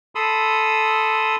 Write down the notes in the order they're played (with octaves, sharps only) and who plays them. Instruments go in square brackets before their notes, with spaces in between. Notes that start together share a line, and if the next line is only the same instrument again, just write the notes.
[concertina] A4 B5 C6 D#6 E6